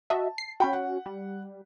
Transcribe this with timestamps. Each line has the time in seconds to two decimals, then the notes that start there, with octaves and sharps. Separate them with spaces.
0.10 F#4 D#5 E5 A5
0.38 C7
0.60 C#4 F#4 G5 B5
0.73 F#5
1.06 G3